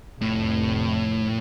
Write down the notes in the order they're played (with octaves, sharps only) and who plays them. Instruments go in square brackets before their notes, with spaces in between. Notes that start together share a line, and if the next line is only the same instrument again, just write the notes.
[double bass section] F1 [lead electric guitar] A2